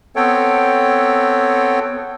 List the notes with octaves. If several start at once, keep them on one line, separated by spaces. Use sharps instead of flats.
B3 C4 A4 C#5 G5